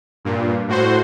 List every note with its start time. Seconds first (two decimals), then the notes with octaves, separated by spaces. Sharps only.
0.25 G2 A#2
0.68 A2 F#4 C5